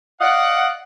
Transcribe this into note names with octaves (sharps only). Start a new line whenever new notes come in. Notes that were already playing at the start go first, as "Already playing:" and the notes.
D5 D#5 F5 F#5